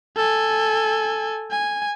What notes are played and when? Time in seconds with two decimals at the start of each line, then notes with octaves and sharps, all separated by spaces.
0.16 A4 G#5
1.51 G#5